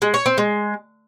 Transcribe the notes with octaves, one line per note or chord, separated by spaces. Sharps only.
G#3
C#5
C4
G#3